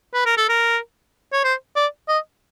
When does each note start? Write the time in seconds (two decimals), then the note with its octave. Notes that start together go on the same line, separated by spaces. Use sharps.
0.14 B4
0.26 A#4
0.37 A4
0.49 A#4
1.33 C#5
1.44 C5
1.76 D5
2.08 D#5